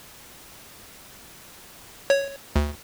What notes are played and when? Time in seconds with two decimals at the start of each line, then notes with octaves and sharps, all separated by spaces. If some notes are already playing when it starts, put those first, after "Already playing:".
2.10 C#5
2.56 D2